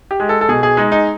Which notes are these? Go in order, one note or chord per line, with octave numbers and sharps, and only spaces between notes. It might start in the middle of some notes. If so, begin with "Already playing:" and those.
G4
G#3
A4
A4
B2 G#4
G#4
G#3 D#4
D#4